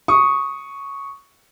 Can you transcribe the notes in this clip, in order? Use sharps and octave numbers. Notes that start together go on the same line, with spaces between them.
C#6 D#6